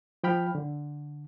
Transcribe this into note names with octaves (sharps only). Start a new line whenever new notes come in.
F3 G5 B5 F6
D3